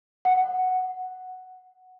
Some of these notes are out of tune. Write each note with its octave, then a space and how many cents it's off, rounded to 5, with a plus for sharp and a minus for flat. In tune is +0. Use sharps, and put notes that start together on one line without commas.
F#5 +0